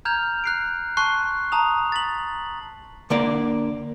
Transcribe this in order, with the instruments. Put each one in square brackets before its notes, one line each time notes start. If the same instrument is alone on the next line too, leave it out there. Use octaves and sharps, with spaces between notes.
[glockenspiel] A#5 F6 G6 G#6 F7
F#6 C7 D7
A5 C6 C#6 F#6 C7
A5 A#5 D#6 F7
A6 B6 F#7
[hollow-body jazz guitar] D3 A#3 D5